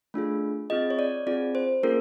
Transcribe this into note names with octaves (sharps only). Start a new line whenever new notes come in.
A3 D4 F4 G#4
C4 F4 G#4 D#5
C#5
D5
C4 F4 G#4 D5
C5
A#3 C#4 F4 G#4 A#4